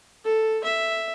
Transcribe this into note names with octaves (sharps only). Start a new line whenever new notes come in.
A4
E5